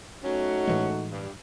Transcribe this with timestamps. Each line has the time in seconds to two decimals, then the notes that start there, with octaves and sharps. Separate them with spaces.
0.24 F#3 A3 C#4 D#4 F#4
0.67 A2 E3 G#3
1.11 G2